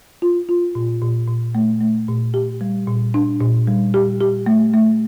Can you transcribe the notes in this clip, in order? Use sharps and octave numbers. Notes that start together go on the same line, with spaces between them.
F4
F4
A#2
A#2
A#2
A3
A3
A#2
G4
G3
A#2
D4
A#2
G3
G4
G4
A3
A3